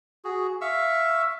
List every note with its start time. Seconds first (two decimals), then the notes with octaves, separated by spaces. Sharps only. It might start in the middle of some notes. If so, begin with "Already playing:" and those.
0.25 F#4 G#4
0.61 E5 F5 C#6 E6